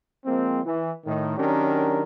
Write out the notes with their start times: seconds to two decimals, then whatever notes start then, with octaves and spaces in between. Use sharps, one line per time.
0.25 F3 G#3 A#3 C4
0.65 E3
1.06 A2 D#3
1.37 D#3 F#3 C#4 D4 G4 A#4